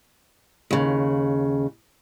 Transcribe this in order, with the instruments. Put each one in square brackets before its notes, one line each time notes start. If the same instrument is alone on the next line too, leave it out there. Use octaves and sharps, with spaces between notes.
[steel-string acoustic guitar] D#2 C#3